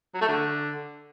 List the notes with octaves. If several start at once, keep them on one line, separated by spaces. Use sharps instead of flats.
F#3
A3
D3